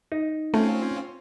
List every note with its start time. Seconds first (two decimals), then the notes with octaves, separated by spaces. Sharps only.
0.12 D#4
0.54 A3 C4 C#4 F4